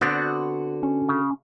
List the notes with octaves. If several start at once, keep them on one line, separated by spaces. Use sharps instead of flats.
D3 B3 C4 D4 F#4
C#4
C#3